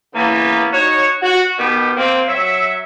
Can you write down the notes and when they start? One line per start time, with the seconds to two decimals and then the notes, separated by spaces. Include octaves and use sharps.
0.13 C#3 E3 A#3 B3
0.72 D#4 F#4 C#5
1.21 F#4
1.58 B2 D#3 B3 G4
1.96 A#3 C4
2.27 F#3 E5